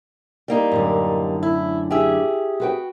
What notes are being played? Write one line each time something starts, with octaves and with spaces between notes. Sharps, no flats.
G3 A#3 D#4
F#2 A2 D3
E4
G4 G#4 E5
F#4 B4 G5